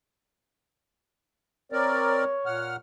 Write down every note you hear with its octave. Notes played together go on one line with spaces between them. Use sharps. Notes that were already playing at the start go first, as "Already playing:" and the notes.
C4 A#4 C#5 D5
A#2 F#5 F6